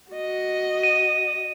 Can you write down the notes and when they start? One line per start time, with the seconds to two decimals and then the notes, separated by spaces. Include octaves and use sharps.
0.11 F#4 D#5
0.83 D#7